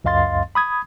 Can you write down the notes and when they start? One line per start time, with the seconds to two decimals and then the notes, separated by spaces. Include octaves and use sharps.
0.04 C#2 F#2 D#5 F5 C6 A6
0.55 B5 D#6 G#6